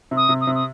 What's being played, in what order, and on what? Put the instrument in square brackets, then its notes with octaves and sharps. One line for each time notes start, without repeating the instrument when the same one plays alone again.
[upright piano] C3
[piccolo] D#6
[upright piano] C3
[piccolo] D#6
[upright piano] C3
[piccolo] D#6